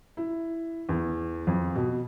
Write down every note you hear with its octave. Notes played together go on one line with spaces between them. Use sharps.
E4
E2
F2
B2